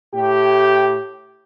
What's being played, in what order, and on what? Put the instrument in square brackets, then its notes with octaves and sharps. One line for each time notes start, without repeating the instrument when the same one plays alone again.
[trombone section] A2 G4